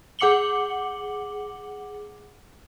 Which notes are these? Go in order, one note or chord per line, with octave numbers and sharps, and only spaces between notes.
G#4 F#5 D6 C#7 F#7 G7